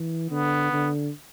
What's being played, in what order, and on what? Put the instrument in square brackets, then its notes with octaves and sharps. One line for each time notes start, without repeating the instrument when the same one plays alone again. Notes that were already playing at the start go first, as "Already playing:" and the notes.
Already playing: [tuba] E3
[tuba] D3 [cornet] B3
[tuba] D3